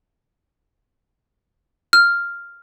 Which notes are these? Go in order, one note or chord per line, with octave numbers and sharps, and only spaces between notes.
F6